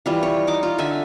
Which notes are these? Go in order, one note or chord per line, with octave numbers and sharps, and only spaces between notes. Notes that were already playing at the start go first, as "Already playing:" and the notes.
E3 G3 F4
C#5
D#4 D6
F4
D3 E5 G#5